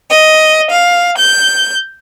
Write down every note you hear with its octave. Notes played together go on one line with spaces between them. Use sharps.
D#5
F5
G6